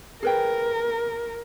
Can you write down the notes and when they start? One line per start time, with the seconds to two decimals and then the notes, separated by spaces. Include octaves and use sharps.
0.23 G#4 A#4 B4 G5